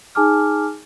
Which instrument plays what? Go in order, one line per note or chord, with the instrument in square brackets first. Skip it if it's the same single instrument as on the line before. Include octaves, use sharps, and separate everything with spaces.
[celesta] D#4 G#4 G#5 A5 D6 F6